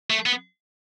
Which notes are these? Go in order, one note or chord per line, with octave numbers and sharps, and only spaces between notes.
A3
B3